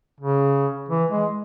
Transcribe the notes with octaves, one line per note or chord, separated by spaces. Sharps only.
C#3
E3
G#3